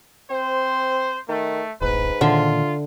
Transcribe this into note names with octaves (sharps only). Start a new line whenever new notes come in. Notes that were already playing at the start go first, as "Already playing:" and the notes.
C4 C5
D#3 A3
D1 A1 G#2 B4
A#2 D3 D#3 F4 E5